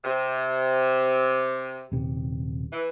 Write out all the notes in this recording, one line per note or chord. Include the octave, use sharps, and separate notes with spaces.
C3
D#1 C3
E3